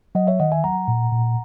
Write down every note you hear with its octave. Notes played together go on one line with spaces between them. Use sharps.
F#3 D#5 F#5
C#5 E5
D#3 D#5 F#5
E5 G#5
F#3 F#5 A#5
A#2
A#2